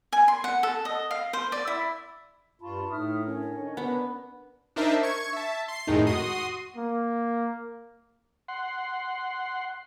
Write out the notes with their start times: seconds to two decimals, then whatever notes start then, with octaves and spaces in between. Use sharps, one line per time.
0.13 G#5
0.28 C6
0.44 F#5
0.63 A4
0.85 D#5
1.11 F5
1.33 C5
1.52 D5
1.67 E4
2.62 G2 F4 A5 B5 C#6
2.90 A2 D#4 E5 D#6 F6
3.25 C#4 D4 A#4
3.55 D#3
3.77 B3 D4 B4
4.76 D4 D#4 A#4 C5 E5 A5
5.03 C#6 G#6
5.33 E5 A5
5.68 C6 C7
5.87 F2 A2 D#3 G#3 A3 D#4
6.07 F#4 C6 D#6
6.76 A#3
8.48 F#5 C6